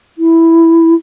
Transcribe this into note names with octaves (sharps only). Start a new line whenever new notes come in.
E4